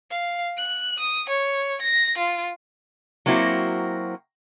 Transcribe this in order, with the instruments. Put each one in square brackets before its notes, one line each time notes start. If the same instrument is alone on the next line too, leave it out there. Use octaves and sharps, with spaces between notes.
[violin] F5
F#6
D#6
C#5
A#6
F4
[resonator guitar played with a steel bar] F#3 A#3 C4 E4 F#4